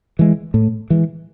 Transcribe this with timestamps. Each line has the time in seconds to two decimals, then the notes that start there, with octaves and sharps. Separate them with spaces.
0.19 E3 G#3
0.54 A2
0.90 E3 G#3